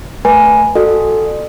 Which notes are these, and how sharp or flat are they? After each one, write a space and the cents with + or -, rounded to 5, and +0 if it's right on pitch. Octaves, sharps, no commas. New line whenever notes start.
A3 +0 B4 -15 G#5 +0
F#4 +0 A4 +0 D5 +45